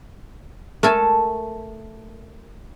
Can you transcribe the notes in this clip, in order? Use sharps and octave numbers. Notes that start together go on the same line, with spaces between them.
A3 A4 A#4 G#5 A5